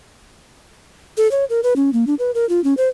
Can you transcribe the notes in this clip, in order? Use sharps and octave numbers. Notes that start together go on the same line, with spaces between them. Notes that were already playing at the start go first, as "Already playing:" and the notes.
A4
C#5
A#4
B4
C#4
A#3
D4
B4
A#4
F4
C#4
C5